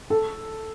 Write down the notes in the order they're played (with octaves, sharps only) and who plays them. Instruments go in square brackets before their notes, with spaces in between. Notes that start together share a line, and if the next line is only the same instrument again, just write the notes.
[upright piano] A4